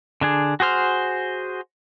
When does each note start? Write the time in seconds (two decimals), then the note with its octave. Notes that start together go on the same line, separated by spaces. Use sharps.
0.21 D3 D4 G#4
0.60 F#4 G#4 C5 F6